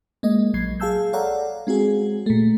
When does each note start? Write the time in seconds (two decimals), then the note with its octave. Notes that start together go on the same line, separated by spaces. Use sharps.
0.23 G#3 A#3 D#5
0.54 A#1 F#3 G#6 C7
0.80 G#4 F5 A5 E6 G6
1.13 A4 C#5 D5 F5 F#5 A#5
1.67 G#3 C4 F#4 G#4
2.26 A#2 A3